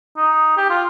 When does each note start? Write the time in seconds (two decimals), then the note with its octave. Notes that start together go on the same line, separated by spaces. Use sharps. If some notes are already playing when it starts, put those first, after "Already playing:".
0.17 D#4
0.57 G4
0.70 F4